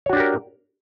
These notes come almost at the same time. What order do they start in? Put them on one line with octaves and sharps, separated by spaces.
C#5 F#4 D4 G4 A#4